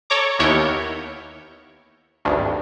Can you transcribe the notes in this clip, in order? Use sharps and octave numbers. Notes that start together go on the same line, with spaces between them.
A4 C#5 A#5 D6
D#2 B3 E4 A#4 C#5 G6
G#1 D2 G2